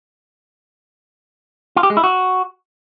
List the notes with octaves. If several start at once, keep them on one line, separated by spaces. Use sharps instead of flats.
F4
G4
G#3
E4
F#4